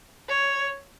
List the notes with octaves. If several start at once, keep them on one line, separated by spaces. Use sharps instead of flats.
C#5